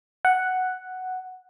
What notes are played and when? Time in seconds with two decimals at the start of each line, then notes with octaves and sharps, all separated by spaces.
0.25 F#5